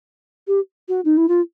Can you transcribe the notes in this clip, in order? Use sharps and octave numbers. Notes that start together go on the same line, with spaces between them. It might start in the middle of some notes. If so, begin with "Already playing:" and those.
G4
F#4
D#4
E4
F4